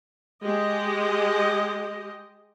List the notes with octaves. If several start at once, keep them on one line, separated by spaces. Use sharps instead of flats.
G#3 G4 D#5